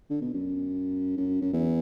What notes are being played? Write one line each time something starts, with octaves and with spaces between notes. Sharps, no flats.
D3
B2
F#2
F#2
F#2
E2